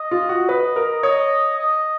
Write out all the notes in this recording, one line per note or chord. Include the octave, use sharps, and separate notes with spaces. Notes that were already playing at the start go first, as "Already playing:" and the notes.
Already playing: D#5
F4
F#4
B4 D#5
A#4
C#5 D#5
D#5